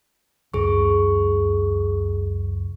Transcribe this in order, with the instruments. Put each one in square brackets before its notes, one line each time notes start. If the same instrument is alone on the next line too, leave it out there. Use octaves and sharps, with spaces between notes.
[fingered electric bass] C#2 F#2 [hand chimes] G#4 C#6